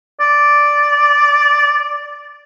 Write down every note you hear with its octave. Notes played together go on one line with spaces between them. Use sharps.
D5